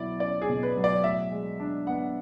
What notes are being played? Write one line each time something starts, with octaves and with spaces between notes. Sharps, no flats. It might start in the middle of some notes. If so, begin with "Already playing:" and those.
Already playing: B2 F#3 E4 D5
C#4 D5
G#4
B2
B4
F#3
D5
A2 E5
G#3
D4
B3 F#5